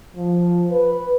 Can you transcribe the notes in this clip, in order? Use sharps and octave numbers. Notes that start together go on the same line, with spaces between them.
F3
B4